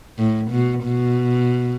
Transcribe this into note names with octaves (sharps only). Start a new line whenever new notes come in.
A2
B2
B2